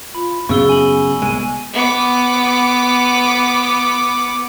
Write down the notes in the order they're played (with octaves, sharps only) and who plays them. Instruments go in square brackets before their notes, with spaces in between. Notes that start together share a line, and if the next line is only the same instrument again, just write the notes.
[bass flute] F4 [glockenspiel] B5
[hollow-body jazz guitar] F#2 C#3 [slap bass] B3 [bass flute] G#4 [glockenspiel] C#6 E6 G7
[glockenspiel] G#5 F#7
[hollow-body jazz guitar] C2 G#3 [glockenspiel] G#5 D#7
[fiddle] B3 D6